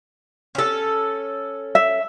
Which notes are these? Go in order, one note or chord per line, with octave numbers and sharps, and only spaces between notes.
C#4 A4
E5